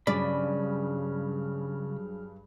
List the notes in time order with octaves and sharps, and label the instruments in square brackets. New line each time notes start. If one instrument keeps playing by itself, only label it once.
[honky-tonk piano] G2 [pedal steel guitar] C#3 B5 [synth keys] F#3 G#4 F6 [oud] D5